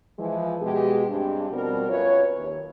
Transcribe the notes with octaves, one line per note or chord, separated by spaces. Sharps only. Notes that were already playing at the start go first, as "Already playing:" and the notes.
E3 F3 G#3
B2 G#3 G4
G2 G#3 C4 D4
B2 F3 G3 C4 F#4 A#4
F#2 F4 B4 C#5
D#2